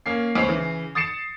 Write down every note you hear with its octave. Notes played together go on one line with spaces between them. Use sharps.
A#3 C#4 C7
C#2 C4 C#5 C7
C#3 E3
D#6 A6 C7 C#7 E7